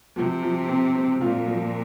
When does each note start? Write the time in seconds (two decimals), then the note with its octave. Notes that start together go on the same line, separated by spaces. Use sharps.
0.16 C3 F3
0.42 F3
0.68 C4
0.94 C4
1.21 A#2 F4
1.47 F3